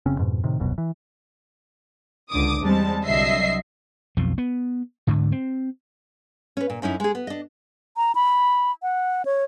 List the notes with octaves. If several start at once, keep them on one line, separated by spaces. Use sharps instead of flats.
F#1 C#3 C4 C#4
F2 G#2 B2
A2 C3 D#3
D#1 C2 F#2 B2
E3
C#2 D3 D6 D#6
E2 G3 G#3 C4 A5
C2 D3 F#3 D#5 E5 C7
B1 F2 F3
B3
D2 G#2 D3
C4
C#4 B4
A#2
F#2 C#4 D#4 E4
G#3 G#4
B3
D4 D#5
A#5
B5
F#5
C#5